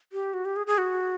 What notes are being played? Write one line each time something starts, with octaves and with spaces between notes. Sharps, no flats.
G4
F#4
G4
G#4
G#4
F#4